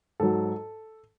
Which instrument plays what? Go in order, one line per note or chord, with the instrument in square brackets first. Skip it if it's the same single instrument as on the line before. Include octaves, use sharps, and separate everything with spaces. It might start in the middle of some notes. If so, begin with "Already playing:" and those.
[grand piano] G#2 F#3 A4